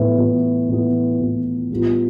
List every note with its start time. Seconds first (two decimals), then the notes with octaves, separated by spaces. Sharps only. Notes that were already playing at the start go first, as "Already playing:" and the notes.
Already playing: A2 E3 B3
0.17 A2 E3 B3
0.68 A2 E3 B3
1.20 A2 E3 B3
1.70 A2 G3 B3 F4